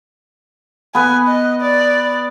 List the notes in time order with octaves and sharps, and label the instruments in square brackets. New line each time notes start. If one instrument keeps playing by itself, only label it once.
[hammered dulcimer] B3 B4 [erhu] G#5
[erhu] D#5
D5